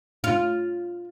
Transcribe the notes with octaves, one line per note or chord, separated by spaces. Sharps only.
F4